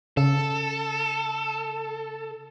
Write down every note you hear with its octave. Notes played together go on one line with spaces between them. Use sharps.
C#3 A4